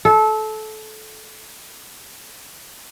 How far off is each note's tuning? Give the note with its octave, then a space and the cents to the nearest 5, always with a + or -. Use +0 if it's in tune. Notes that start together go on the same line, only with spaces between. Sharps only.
A4 -20